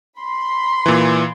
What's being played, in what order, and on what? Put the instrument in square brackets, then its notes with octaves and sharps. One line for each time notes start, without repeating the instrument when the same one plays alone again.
[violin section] B5 C6
[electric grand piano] A#2 E3